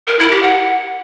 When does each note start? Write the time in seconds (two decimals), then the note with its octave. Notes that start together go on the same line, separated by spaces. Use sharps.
0.07 A#4
0.19 E4
0.31 G4
0.43 F#5